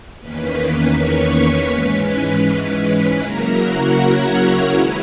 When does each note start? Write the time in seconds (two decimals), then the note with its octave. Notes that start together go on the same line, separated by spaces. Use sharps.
0.20 E2 D#3 A#3 C#4 B4 B5
0.95 C#5 C#6
1.69 G#2 E3 G#3 C#4 B4 B5
3.19 C#3 F#3 A#3 E4 A#4 A#5
3.56 F#4 F#5
3.94 C#4 C#5
4.69 D#3 G#3 C#4 E4 B4